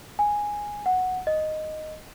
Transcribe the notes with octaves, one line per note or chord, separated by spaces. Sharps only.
G#5
F#5
D#5